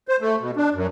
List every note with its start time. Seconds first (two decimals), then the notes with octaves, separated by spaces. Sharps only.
0.08 C5
0.21 A3
0.40 B2
0.56 D4
0.74 F#2